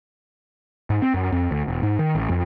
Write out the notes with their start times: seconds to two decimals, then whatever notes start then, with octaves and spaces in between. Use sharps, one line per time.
0.90 G#2
1.02 C4
1.14 F#2
1.32 F2
1.51 D2
1.68 E1
1.83 G#2
1.99 D#3
2.15 A1
2.29 F2